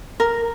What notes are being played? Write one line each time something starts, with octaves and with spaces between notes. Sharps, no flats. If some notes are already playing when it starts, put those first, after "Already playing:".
A#4